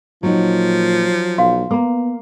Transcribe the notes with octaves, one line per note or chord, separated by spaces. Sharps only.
A#2 F3 F#3 D#4
B1 F5 C6
A#3 B3 A#5 D6